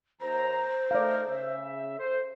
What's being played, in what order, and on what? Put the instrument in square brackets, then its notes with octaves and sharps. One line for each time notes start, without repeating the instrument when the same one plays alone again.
[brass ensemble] D#2 A#5 [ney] C5
[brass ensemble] A3 D#4 A#4 [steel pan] D5 F5
[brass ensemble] C#3 E5
A4 C5